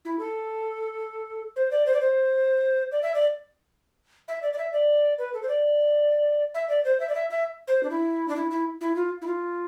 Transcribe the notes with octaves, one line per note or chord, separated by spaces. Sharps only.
E4
A4
C5
D5
C5
D5
C5
D5
E5
D5
E5
D5
D5
E5
D5
B4
A4
C5
D5
E5
D5
C5
E5
D5
E5
E5
C5
D4
E4
D4
E4
E4
E4
F4
E4
F4